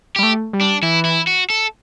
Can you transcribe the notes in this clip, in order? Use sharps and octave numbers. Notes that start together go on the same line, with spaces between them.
G3 G4
A3
G3
D4
E3 E4
E4
F#4
A4